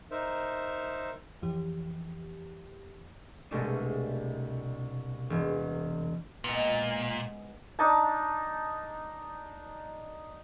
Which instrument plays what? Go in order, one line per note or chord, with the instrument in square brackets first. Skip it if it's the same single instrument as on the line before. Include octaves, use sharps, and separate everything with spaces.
[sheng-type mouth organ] D#4 A#4 C5 E5
[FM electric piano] F2 E3 G4
[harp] C2 B2 G#3 A3 D4 D#7
E1
[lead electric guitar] A#2 [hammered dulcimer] G#3 B3
[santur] D4 D#4 A5